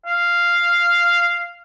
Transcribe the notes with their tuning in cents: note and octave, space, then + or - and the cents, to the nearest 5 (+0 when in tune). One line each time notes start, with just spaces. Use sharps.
F5 -5